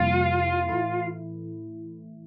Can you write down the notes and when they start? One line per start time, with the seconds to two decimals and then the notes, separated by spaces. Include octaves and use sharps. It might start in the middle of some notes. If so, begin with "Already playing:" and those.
Already playing: F2 C3 G3 A#3 E4 F4
0.68 A2 E3 A3 E4